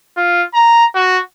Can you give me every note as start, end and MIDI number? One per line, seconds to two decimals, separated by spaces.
0.17 0.44 65
0.54 0.85 82
0.95 1.19 66